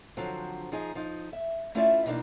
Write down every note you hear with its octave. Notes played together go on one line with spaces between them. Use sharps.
D3 F3 F#3 C4
F3 D#4 G#4
F3 D#4
E5
A3 C#4 E4 F4 D5 E5
B2 E3 G3 A#3 D4 D#4